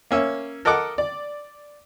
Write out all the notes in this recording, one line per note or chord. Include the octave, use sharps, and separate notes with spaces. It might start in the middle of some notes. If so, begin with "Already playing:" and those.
A#3 C#4 E5
A4 A#4 D#5 F#5 D6
D5